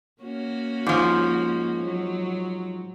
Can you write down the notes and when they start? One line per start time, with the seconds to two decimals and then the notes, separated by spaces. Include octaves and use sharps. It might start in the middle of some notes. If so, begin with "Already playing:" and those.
0.22 A#3 C#4 F#4
0.87 G#2 F3
1.85 F#3